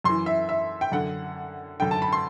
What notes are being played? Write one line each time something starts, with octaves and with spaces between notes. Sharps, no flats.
F#2 E3 C6
E5
E5
G5
F#2 D3 F#5
F#2 D3 G5
A5
B5
C6